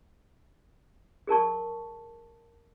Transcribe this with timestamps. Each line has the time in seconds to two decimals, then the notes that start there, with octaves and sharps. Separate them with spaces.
1.27 G#4 A#4 A5 C#6